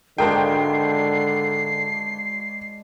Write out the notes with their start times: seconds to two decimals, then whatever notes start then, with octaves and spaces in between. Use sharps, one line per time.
0.18 G#1 D3 G#3 D4 A#4 C5 G5 C7